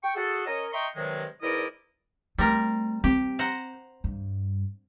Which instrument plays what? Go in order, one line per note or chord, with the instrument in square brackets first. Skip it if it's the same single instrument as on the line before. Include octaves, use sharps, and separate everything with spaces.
[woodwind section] G5 C#6
F#4 G#4 A4
C#4 A#4 C#5 D#5
D#5 E5 G5 A#5 C6 C#6
G2 C3 D#3 F#3 G#3
E2 G#2 E4 A#4 D5 D#5
[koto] G3 C4 A#4 [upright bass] A3
[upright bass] C4 [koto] G4
[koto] C5 F#5 A#5
[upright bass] G2